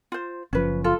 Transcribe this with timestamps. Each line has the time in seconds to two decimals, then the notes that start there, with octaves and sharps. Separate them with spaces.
0.12 F4 C5
0.53 F#1 F3 C#4 B4
0.84 F4 A4